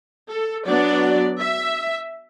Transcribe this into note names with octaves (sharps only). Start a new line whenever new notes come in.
A4
F#3 B3 D4 D5
E5